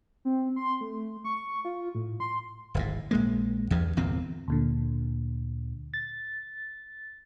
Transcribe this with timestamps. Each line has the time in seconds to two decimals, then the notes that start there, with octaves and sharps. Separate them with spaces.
0.25 C4
0.56 C6
0.81 A3
1.24 C#6
1.65 F4
1.95 A2
2.20 C6
2.74 D1 G#1 A2
3.11 A#1 G#3 A#3
3.70 E2 G2 F3
3.96 G1 E2 A#2 C4
4.48 D2 A#2 D3
5.94 A6